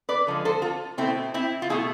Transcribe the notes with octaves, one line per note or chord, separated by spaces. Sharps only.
B4 D5
D3 F3 G#3
A4 C5
F4 A4
B2 A3 C4 E4
C4 E4
F4
B2 A3 E4 G#4